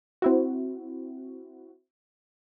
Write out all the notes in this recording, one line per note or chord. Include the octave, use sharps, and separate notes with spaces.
C4 E4 F#4